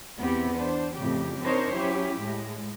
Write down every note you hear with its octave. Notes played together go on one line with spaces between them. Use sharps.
E2 B3 C4 G4
D4 C5
F2 A2 C#3 G4
C4 D4 D#4 A#4 C5 C#5
F#3 C#4 E4 G4
A2 G#3